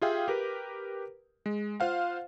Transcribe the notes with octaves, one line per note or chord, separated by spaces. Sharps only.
F4 G4 G#4 E5 F5 G5
G4 A#4 B4
G#3
F4 C5 F5 F#5